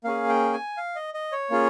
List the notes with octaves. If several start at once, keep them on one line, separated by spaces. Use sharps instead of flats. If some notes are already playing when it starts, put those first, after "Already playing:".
A#3 C#4 G#4 F5
G5
G#5
F5
D#5
D#5
C#5
A#3 C#4 F4 G#4